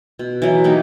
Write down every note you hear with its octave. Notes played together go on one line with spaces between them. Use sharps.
B2
E3 F#3
A#3 D#4 G4